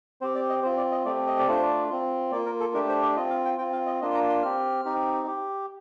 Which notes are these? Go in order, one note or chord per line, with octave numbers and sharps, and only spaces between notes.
C4 G4 C5
D5
D#5
C4 F4 C5
D5
D#5
A3 C4 G4 D5
D#5
D5
A3 D4 F4 C5
D5
C4 F4
A#3 F4 D5
A#4
A4
A3 D4 G4 A#4
C5
D5
C4 F4 D#5
F5
G5
C4 F4 G5
F5
D#5
A#3 D4 F4 D#5
C6
A#5
C6
C4 G4 F6
C4 D#4 G4
G4